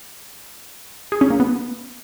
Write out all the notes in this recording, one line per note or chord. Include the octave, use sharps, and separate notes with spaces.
G#4
C#4
A#3
B3